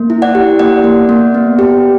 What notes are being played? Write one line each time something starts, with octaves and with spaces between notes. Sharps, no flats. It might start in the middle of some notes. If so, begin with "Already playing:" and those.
Already playing: A#3
E4
D5 F#5
G4
A#3 D5 F#5
A#3
A#3
B3
G4